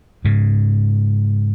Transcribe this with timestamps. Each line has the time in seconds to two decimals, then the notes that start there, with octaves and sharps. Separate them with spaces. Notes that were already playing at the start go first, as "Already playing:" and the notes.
0.25 G#2 C#3